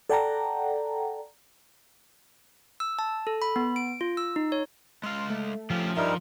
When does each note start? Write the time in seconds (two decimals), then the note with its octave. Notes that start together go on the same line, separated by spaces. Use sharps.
0.10 A4 D5 F#5 G5 A5 A#5
2.80 E6
2.99 A5
3.27 A4
3.42 B5
3.56 B3
3.76 D7
4.01 F4
4.17 E6
4.36 D#4
4.52 C#5
5.03 G#3 F5 C6
5.30 A3
5.70 F3 C#4 F4 G4
5.97 G2 G3 D#4 A#4 E5